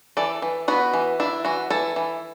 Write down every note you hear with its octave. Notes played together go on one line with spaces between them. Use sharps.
E3 A4 D5
E3
B3 F#4 B4
E3
D4 E4
E3 F#4
E3 E4 A4
E3